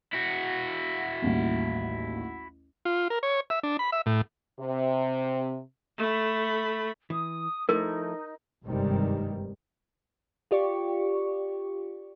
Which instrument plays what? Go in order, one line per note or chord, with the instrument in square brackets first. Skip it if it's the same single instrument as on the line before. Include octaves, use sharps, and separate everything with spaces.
[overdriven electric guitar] E4 F#4
[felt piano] A1 D#2 G3
[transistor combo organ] F4
A#4
C#5
E5
D4
B5
E5
A2
[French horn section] C3
[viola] A3 B5
[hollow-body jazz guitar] E3 [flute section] D#6
[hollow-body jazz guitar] F3 A3 E4 [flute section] D#4 [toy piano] A#4
[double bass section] F#1 G2 C3 D#3 G3 G#3
[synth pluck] F4 G4 D5 C#6